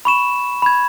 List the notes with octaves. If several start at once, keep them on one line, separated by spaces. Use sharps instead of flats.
B5 C#6 E7
B5 G#6